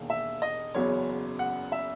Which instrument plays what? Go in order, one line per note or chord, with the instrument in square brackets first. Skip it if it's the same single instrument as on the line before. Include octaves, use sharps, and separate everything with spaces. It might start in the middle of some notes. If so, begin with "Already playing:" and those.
Already playing: [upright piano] E1 D#2 D#3 A#3
[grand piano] E5
D#5
[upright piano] F#1 E2 C#3 F#3 B3 [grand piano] C#5
[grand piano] F#5
E5